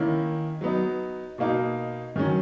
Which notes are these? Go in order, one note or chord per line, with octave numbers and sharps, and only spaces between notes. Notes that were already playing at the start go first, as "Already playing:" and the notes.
Already playing: D#3 A#3 C#4 E4
F#3 B3 D#4
B2 A#3 D#4
D#3 F#3 C#4